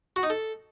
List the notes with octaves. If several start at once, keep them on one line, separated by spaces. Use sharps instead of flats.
F#4
D#4
A4